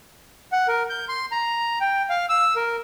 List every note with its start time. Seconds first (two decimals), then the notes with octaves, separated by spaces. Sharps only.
0.52 F#5
0.68 A#4
0.90 G6
1.09 C6
1.32 A#5
1.80 G5
2.10 F5
2.29 E6
2.56 A#4